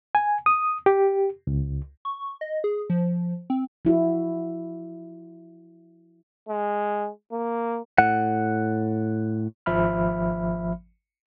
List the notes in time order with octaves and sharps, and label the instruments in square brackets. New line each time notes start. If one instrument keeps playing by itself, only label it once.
[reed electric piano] G#5
D#6
G4
C#2
[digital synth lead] C#6
D#5
G#4
F3
C4
[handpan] F3 E4 F#4
[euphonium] G#3
A#3
[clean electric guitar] A2 F#5
[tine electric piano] G#1 F3 E5 B5 F6